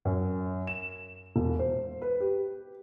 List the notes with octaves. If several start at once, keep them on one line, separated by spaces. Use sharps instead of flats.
F#2
E7
E1
C5
B4
G4